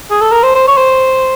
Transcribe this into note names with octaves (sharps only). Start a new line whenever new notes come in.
G#4
A4
A#4
C5
C5
C#5
C5